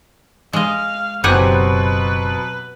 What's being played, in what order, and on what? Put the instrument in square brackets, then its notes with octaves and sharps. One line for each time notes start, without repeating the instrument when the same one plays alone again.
[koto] G#3 D#5 [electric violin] F5
[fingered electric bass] F#1 [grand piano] B2 F#3 C4 [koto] G4 F#5 G#5 [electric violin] B4